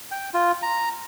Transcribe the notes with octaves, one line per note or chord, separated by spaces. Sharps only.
G5
F4
A#5